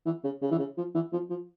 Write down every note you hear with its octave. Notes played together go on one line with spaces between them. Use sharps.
E3
C#3
C#3
E3
C#3
F3
E3
F3
F3